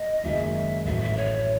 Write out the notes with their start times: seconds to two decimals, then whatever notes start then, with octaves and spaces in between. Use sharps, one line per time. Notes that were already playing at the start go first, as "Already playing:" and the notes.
Already playing: D#5
0.23 F#1 F#2 D#3 G#3 E5
0.85 A1 A2 F#3 E5
1.01 E5
1.17 C#5